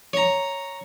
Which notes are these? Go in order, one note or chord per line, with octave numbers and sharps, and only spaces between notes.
C#5 A#5